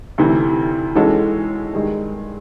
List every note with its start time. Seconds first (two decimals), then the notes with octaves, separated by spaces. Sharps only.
0.18 D2 C3 E3
0.95 E3 G#3 C#4 F#4 A4
1.74 G2 D#3 G#3